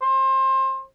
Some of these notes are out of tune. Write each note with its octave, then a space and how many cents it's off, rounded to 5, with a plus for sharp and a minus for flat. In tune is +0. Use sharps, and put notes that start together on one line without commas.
C5 +25